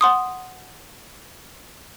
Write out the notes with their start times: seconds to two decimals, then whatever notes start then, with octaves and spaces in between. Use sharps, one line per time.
0.01 F#5 C6 D#6